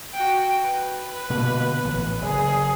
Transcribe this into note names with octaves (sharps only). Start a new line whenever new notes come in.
F#4 G5
B4
B2 D3 A#3
A1
F#1 G#4